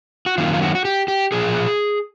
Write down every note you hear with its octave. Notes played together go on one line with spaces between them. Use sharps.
F#4
F#2 D#3 F#3 A#3 D#4 F4
F4
F#4
F#4
G4
G4
A#2 F3 A#3 G#4